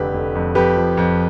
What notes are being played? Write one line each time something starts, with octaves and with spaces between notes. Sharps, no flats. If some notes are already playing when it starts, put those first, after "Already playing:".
Already playing: F1 D3 G4 B4
F1
F2
F2 G4 B4
F3
F2